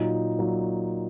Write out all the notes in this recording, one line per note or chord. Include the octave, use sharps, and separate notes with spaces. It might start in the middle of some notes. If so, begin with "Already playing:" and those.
Already playing: A#2 F#3 D#4
A#2 F#3 D#4